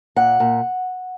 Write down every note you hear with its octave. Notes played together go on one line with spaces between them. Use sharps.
A#2 F#5
A#2